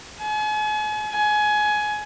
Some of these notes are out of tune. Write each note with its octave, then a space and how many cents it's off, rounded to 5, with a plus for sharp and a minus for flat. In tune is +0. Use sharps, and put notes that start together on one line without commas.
G#5 +40
G#5 +20